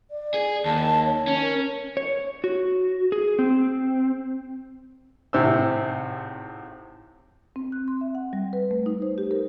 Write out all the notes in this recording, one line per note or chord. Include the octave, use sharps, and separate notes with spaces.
D5
G#4
D#2 A5
C#5
C#4
A#4
C#5
F#4
G#4
C4
G#1 A2 C3 C5 E6
C4
F#6
C6
E5
F#5
G3
B4
A3
D#4
C5
G4
A#4